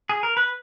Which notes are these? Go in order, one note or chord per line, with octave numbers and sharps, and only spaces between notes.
G#4
A#4
B4